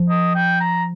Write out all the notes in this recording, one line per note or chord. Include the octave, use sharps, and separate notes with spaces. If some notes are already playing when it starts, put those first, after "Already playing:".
Already playing: F3
D#5
G5
A#5